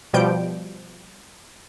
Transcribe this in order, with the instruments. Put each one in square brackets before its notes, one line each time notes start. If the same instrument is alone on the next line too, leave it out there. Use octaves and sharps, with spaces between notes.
[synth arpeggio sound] B2 F3 G3 G6 D7